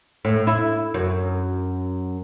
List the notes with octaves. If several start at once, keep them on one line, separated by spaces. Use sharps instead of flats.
A2
E4
F#2